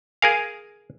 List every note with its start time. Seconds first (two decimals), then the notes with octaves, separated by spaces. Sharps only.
0.22 G#4 A#4 F5 G#5